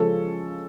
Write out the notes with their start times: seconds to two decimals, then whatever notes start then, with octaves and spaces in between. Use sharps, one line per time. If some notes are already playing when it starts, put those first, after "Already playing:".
Already playing: C#3 F3 G#3 C#4 A4